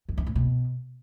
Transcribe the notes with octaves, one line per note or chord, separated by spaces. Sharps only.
F#2
G2
A2
B2